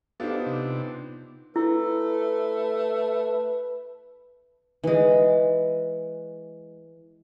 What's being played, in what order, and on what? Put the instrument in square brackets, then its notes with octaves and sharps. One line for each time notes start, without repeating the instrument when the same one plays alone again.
[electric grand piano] B3 G4 C5 [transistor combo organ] D4 A4 [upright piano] D#4 F4
[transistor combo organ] C3 D4
[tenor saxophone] A3 [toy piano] E4 [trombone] B4
[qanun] E3 G#3